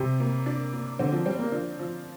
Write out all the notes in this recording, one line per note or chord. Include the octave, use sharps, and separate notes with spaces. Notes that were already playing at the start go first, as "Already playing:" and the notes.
Already playing: C3 G3
A#3
D4
A#3
D3 C4
F3
G3 C4
A#3
F3 D4
F3